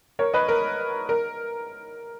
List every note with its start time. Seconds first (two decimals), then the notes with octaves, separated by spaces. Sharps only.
0.19 A#4 C#5
0.34 B4 D#5
0.48 A#4
1.09 A#4